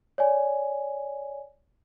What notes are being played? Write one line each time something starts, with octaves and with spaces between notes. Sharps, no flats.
C#5 D5 G#5